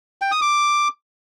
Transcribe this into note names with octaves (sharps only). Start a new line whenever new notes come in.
G5
D#6
D6